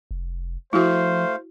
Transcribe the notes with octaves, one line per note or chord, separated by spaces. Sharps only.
F1
F3 A3 E4 F#4 C5 F5